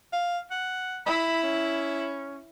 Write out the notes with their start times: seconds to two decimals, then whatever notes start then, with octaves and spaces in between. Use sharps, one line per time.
0.13 F5
0.51 F#5
1.06 E4 B5
1.43 C#4